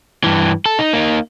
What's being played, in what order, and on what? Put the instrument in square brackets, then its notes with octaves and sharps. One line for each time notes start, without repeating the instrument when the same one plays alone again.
[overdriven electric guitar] G2 E3
A4
D#4
A#3 D#4